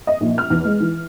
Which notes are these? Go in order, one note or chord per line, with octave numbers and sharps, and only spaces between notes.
D#5
A#1
F6
E2
G#3
E3